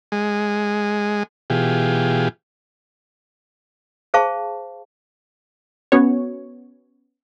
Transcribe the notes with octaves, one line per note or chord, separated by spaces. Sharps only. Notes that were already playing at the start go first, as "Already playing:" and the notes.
G#3
B2 E3 F4 G4 G#4
G#4 C5 F5 A5 C#6
B3 C#4 F#4 C#5